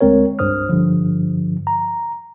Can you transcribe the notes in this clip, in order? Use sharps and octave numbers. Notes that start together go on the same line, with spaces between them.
D2 G#3 C4 A#4 C#5
C2 G2 C5 D#6 F6
G2 D3 F3
A#5